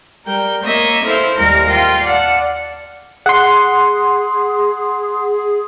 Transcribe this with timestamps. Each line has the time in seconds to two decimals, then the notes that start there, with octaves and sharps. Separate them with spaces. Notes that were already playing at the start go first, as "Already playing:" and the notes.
0.25 G3 A#4 G5
0.63 A#3 C#5 D#5 E5
1.04 E4 A4 C5 F5
1.36 D#2 G3 A#4 F5 A#6
1.69 F4 F5 G5
2.04 D5 F5 F#5 A5
3.26 G#4 F#5 C6